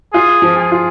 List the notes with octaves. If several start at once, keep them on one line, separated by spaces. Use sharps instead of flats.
F4 G#4
F3
G#4
F4